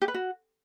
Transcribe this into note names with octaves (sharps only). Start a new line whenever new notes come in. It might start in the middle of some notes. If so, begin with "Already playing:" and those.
G4
B4
F#4